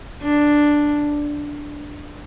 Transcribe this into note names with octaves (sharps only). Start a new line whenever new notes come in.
D4